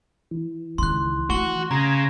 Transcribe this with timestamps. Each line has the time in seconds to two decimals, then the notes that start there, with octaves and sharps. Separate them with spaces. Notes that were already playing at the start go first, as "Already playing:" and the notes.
0.31 E3
0.78 C#2 D#3 C6 F#6
1.30 A3 F#4 C#6 G7
1.71 C#3 A#5 G#6 A#6